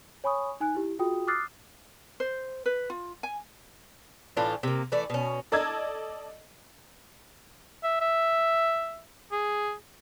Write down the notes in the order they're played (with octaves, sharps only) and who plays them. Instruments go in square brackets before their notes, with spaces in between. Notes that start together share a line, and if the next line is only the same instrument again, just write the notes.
[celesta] C#5 G#5 B5 C#6 D#6
D#4 G#5 F#6
E4 G4
F4 F#4 G#4 G5 D#6
D6 D#6 F6 F#6 A6 C7
[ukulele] C5
B4
F4
G#5
[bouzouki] A2 E3 D4 F4
C3 A#3
E3 A3 D5
B2 C#4
[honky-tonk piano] A4 D5 D#5 A5 E6 G#6
[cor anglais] E5
E5
G#4